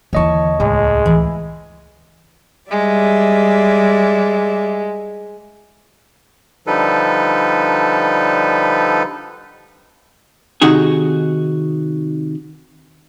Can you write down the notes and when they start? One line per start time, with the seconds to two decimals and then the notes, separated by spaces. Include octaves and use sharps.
0.13 D#2 D3 E3 C#5 D#5 A5 C#6
0.60 C#2 A2 G#3
1.06 E3
2.71 G3 G#3 D5 E5
6.67 D3 F3 G3 D#4 A4 B4
10.62 C3 D#3 D#4 F#4 G#4